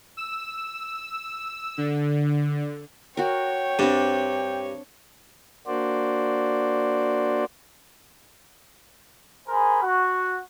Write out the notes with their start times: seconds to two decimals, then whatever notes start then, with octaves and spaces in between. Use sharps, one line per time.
0.17 E6
1.78 D3
3.17 F#4 A#4 C#5 G5
3.79 G2 C4 D4
5.67 A#3 D4 F#4 C5 D5
9.49 G#4 A#4 C5 G#5 B5
9.83 F#4